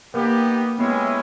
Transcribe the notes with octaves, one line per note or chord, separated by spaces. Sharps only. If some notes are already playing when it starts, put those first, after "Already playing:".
A#3 B3 D#4 G4
G#3 B3 C#4 E4 G4 C#5